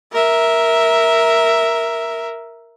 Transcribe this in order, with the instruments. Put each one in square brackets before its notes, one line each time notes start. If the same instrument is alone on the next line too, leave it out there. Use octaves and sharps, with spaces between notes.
[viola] A#4 E5